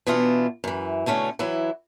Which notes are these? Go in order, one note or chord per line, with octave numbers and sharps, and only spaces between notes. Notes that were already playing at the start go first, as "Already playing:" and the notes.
B2 E3 B3 D4 F4
F#2 E3
B2 D3 A3 C#4
E3 F#3 E4